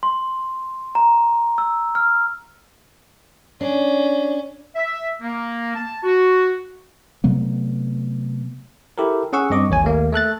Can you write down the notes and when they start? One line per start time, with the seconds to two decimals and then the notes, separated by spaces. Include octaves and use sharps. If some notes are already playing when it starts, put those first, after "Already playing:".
0.03 C6
0.95 A#5
1.58 E6
1.95 F6
3.61 C#4 D4
4.76 E5
5.21 A#3
5.75 A5
6.03 F#4
7.24 C3 F#3 A3 B3
8.98 E4 G4 A4 A#4
9.33 C#4 G#4 F#5 C#6 E6
9.50 G2 C4 D#5 C#6 D6
9.70 A1 D#2 C#5 G#5
9.83 D#2 A3 A#3
10.12 A3 A4 F#6 A6